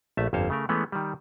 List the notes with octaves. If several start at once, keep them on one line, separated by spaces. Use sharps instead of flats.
A#1 A3 E5 A5
G1 F2 A#3 C5 C#5 A5
C#3 A3 A#4
E3 G#3 A3 B3 C#4
D#3 G3